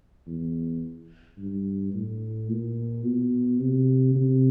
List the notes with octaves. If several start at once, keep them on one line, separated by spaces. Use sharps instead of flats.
E2
G2
A2
A#2
B2
C3
C3